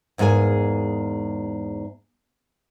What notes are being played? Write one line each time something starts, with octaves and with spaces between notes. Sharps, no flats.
E2 G#2 A#3 G#4 G#5